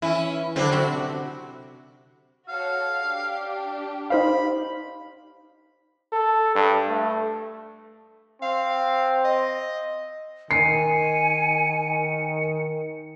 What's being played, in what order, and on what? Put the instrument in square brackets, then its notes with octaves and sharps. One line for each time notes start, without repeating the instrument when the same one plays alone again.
[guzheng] E3 [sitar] C#4 E4
[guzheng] D3 F#3 E4 [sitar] C4 D4
[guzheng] C3 C4 D4 [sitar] F#4
[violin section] F#4 A4 C#5 [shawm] F5
[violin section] D4 G4
[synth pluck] D#4 C5 F5 [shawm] B5
[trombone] A4
G2
A3
[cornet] C4 [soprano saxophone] F5
[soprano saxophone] D#5
[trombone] D#3 [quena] G#5 [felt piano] C7 [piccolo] C#7